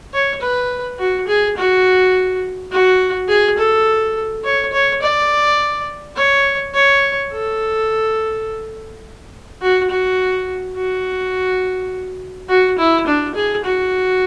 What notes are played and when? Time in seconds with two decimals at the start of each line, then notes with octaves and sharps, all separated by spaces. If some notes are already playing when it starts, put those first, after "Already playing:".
0.13 C#5
0.41 B4
0.99 F#4
1.27 G#4
1.56 F#4
2.72 F#4
3.28 G#4
3.58 A4
4.44 C#5
4.73 C#5
5.02 D5
6.16 C#5
6.74 C#5
7.32 A4
9.61 F#4
9.90 F#4
10.76 F#4
12.49 F#4
12.78 E4
13.07 D4
13.35 G#4
13.64 F#4